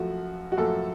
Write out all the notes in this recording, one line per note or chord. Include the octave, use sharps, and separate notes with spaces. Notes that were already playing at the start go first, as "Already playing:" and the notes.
Already playing: F#2 F3 A3 F#4
F#4
F#2 F3 A3 A4